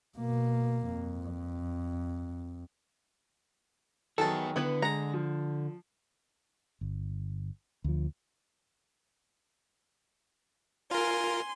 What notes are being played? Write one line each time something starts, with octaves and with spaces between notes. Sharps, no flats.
B2 A#3
F2
D#3 F#3 B3 G#4 A4 A5
D3 B3 E4 B4
G#3 F#5 A#5 A#6
F3
G1
D2 F3
F4 A#4 G#5 C6